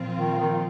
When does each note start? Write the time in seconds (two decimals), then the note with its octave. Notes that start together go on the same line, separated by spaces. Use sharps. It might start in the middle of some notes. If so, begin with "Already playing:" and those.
Already playing: A#2 F3 C4 F4
0.16 D#3
0.40 D#3